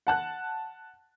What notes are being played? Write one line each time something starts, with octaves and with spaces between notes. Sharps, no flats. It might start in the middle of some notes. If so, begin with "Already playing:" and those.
F#5 A5 F#6